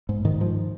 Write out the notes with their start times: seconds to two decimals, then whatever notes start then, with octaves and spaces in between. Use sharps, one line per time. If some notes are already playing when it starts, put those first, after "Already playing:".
0.09 G#2
0.25 G#2 D#3
0.40 G#2 F3